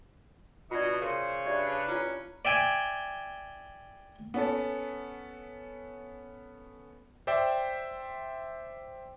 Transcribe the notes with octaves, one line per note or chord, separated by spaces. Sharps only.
B2 B3 D4 F4 D5 D#5
C#3 A#4 C5
D4 G4 B4 D5 E5
C#4 E4 F4 F5
D5 E5 G5 G#5
B3 C#4 A4
C5 D5 E5 G5